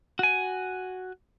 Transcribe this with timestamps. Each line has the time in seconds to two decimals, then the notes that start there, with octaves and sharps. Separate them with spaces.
0.19 F#4 G#5